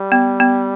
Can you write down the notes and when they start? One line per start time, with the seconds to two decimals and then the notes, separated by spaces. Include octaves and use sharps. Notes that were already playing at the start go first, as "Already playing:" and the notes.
Already playing: G3
0.12 B3
0.40 B3